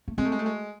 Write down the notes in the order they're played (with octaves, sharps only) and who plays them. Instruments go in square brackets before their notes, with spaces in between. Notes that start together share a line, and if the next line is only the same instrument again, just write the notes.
[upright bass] A3
[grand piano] G#3 [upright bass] C4
[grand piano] A3
G#3
A3
G#3